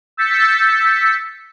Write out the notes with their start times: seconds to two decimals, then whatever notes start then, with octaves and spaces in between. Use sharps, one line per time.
0.17 E6 G6 A6 B6 C#7